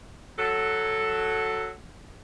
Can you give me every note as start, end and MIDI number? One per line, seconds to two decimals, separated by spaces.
0.37 1.68 54
0.37 1.68 69